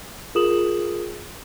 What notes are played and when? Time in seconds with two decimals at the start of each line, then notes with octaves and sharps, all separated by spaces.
0.35 F4 G#4 A#4 D#6 E7 F#7